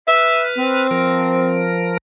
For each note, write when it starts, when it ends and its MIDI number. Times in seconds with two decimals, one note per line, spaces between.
0.08 0.87 71
0.08 0.45 76
0.08 0.87 89
0.58 1.75 60
0.91 1.97 53
0.91 1.97 70